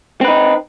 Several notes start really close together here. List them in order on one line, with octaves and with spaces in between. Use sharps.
C4 B4 D#4